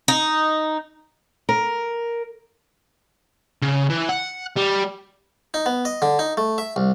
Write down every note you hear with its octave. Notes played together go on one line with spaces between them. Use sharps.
D#4
A#4
C#3
E3
F#5
G3
D#4
B3
D#5
D3
D#4
A3
E5
C2